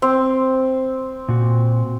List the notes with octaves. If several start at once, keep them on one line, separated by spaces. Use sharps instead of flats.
C4
A#2 F#4